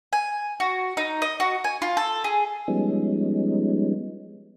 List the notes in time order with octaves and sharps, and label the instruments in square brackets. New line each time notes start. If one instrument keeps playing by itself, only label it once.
[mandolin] G#5
F#4
D#4
D#5
F#4
G#5
F4
A4
G#4
[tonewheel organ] F3 G3 G#3 B3 C#4 D#4